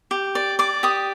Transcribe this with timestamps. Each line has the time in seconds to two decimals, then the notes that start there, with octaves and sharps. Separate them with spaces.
0.11 G4
0.35 D5
0.59 D5 D6
0.83 G4 D#6